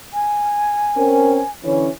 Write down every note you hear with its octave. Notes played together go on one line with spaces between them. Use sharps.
G#5
C4 C#4 A#4
D3 E3 C#4